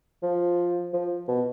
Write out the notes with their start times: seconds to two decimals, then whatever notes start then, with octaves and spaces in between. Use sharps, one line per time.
0.23 F3
0.93 F3
1.28 B2